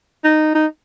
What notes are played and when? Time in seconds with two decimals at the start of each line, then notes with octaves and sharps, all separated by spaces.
0.24 D#4
0.55 D#4